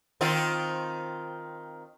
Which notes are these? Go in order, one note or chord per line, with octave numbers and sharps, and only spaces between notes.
D#3 C4 F4